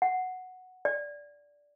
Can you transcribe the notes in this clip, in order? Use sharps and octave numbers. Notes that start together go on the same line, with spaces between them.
F#5
D5